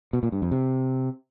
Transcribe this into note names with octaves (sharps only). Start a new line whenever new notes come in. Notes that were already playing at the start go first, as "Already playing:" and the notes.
B2
A#2
G2
F2
C3